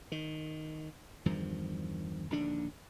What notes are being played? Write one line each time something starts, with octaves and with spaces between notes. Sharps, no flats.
D#3
E2 G2 D#3 F3
A#1 D#2 D3 D4